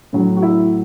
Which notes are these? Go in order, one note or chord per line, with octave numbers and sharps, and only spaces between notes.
A2 F#3
F#4
E4